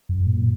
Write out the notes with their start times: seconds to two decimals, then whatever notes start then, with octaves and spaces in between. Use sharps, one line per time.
0.09 F#2
0.27 A#2